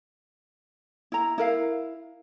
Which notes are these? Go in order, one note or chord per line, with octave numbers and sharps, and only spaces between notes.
E4 A#5
E4 A#4 F5